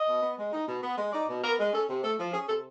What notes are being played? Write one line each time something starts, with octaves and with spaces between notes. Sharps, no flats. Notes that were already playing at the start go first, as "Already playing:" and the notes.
Already playing: D#5
B2
B3
G#3
D#4
B2
B3
G#3
D#4 D5
B2
B3 A#4
G#3
C#4 A4
C3
A3 A4
F3
C#4 G#4
C3 A4